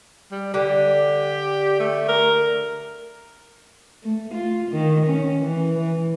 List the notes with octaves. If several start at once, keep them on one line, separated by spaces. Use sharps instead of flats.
G3
D3 G4
A3
A#4
A3
F4
D#3
C#4
E3
E3